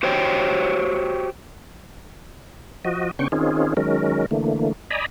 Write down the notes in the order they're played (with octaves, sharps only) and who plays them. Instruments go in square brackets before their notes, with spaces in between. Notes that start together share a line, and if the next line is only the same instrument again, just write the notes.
[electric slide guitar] F#4 G4 C5 C#5 G5
[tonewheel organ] F3 F#4 D#5
C#3 B3 C#4 D4 G5 C#6
D#3 C4 C#4 D#4 F4 G#4
D#3 F#3 G#3 C#4 A#4
D3 E3 A3 A#3
D5 D#5 G#5 A#5 B5